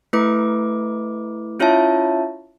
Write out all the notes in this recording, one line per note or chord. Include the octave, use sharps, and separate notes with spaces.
A3 E4 B4 D6
C#4 E4 F4 C#5 E5 A5